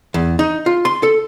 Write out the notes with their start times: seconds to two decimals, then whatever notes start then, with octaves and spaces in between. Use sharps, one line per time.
0.14 E2
0.39 D#4
0.66 F4
0.85 C6
1.03 A4